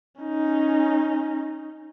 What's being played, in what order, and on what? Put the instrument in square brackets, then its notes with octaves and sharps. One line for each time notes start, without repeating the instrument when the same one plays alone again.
[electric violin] C#4 D#4